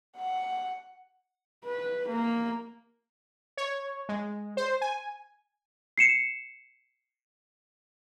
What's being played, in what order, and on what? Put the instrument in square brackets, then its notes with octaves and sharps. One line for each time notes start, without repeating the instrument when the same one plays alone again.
[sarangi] F#5
[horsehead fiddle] B4
A#3
[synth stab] C#5
G#3
C5
G#5
[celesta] C7 C#7 E7